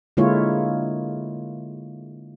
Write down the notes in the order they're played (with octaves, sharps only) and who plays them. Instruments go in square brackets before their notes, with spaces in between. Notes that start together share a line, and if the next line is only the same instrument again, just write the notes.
[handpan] D3 G#3 A#3 E4 F4 C#5